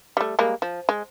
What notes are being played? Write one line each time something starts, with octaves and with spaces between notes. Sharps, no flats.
G3 A3
G3 G#3 A#3
F3
G#3